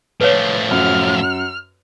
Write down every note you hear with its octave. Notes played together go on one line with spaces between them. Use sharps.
A2 F3 B4 C#5
F#2 F6